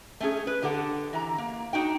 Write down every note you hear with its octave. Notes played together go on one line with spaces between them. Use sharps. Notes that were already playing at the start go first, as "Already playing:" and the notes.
A3 C#4 G#4
B4
D3 G4 A4 F#5
E3 A#5
A#3
D4 D#4 F#4 G5